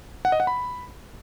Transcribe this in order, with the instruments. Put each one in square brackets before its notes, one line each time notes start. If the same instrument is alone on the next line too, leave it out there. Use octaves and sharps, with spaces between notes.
[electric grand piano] F#5
D#5
F#5
B5